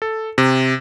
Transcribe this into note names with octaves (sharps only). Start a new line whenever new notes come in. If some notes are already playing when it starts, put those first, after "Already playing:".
A4
C3